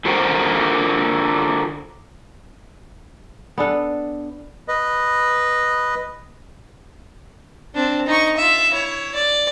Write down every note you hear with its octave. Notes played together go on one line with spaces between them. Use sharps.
D3 F4 A#4 C5 F#5 G5
B3 D4 A4
B4 D#5
C4 D4
D#4 C#6
F4 E5
E4 C#5
D5